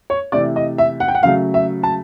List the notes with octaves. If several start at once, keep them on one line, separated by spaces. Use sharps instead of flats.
C#5
C3 E3 A3 D5
D#5
E5
F#5
G5
F#5
C#3 F#3 A3 F5
E5
A5